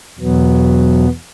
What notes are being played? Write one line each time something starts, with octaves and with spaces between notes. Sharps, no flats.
E2 B2 F#3 B3